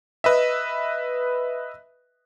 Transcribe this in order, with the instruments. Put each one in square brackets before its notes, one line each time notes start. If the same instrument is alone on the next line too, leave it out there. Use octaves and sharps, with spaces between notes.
[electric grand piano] B4 D#5 E5